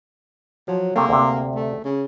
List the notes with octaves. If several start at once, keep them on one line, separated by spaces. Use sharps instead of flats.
F3 F#3
C3 A3 A#3
D2 C3
A3
C#3